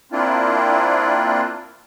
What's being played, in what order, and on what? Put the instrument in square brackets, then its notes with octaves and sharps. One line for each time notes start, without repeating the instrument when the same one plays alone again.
[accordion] A#3 C4 D4 E4 F4